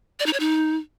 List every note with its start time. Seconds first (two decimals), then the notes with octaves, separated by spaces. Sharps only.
0.20 D5
0.26 D#4
0.33 C#5
0.40 D#4